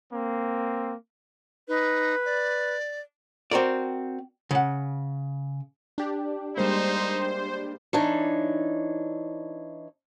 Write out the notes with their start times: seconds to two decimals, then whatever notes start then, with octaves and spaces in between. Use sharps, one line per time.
0.13 A#3 C4
1.68 D#4 B4
2.25 D5
3.51 C4 F#4 A#4 D5
4.51 C#3 F#5
5.98 D4 G4
6.57 G3 G#3 A#3 D#4 C5
7.93 E3 D4 D#4 C#5